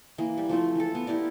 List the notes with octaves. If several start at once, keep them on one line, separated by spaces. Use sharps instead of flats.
E3 A#3
G3
F3 A3 C4
E3 A4
B3
E4 G4 A#4 D5